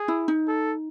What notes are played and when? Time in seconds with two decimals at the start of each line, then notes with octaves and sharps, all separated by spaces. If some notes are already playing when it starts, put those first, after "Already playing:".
Already playing: G#4
0.08 E4
0.28 D#4
0.48 A4